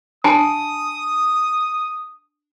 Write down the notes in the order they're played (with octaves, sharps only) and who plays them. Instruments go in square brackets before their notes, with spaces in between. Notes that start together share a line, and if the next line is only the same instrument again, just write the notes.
[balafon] D4 [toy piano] G#5 A5 [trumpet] D#6